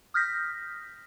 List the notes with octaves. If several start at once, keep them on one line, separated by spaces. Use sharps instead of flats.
D#6 F6 G6 A#6 B6